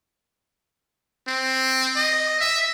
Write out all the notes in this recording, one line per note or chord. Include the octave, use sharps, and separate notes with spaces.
C4
D#5
E5